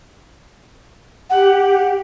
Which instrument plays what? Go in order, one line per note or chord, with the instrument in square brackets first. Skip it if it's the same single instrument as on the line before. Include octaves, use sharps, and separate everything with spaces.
[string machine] G4 [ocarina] F#5